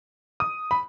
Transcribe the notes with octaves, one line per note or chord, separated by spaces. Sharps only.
D#6
B5